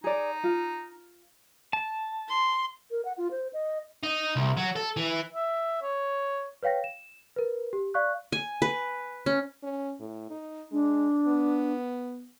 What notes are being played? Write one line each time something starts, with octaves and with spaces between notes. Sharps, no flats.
D#4 G#4 D5
F4
A5
C6
A#4
F#5
F4
C5
D#5
D#4
C2
F#3
A4
E3
E5
C#5
B4 C#5 F5 G5 A#6
E7
A#4 B4
G4
D5 F5 C#6 F#6
G#5
B4
C#4
C#4
A2
D#4
G#3 D4
B3